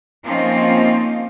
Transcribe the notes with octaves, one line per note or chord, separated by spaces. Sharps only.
F3 A#3 C4 C#4 D#4 F4